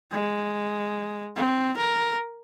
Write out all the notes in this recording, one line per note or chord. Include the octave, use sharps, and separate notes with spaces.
G#3
C4
A#4